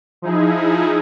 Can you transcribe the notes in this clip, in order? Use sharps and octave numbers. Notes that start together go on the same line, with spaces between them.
F3 D#4 E4 G#4